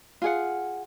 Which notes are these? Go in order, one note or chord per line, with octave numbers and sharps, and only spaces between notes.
F4 G#4 F#5